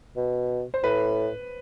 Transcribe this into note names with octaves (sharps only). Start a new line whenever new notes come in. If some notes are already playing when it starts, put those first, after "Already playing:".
B2
C5
A2 B4